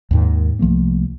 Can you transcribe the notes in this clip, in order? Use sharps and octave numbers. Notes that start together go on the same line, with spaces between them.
D#2 G#2 D#3
C2 F3 A3 A#3